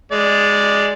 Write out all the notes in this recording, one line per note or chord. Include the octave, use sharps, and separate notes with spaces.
G#3 D5